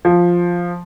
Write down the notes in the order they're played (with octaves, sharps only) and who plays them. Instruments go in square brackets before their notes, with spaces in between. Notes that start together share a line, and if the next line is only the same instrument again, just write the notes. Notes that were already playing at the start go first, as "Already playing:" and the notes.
[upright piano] F3